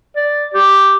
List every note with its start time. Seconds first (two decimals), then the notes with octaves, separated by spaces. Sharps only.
0.16 D5
0.54 G4